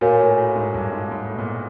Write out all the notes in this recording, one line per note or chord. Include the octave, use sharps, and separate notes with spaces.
A#2 F#4 A#4 C#5 F5 G#5
A2
A2
G#2
G2
G#2
G#2
A2
B2
A#2